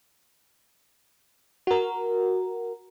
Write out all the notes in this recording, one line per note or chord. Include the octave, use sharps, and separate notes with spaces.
F#4 A#4